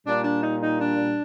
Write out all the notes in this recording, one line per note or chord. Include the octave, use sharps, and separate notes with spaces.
A#2 G3 D4
D4
D#4
D#4
D4